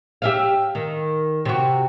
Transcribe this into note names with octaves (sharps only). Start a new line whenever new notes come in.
G4 E5 F5
D#3
C3 F#4